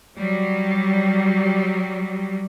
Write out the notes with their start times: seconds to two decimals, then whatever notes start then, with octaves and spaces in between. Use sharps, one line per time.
0.18 F#3 G3